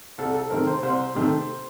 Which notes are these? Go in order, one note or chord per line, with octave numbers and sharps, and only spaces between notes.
C2 A4
A4
C3 D#3 A3 A#4
C5
C2 C5
C3 D#3 A3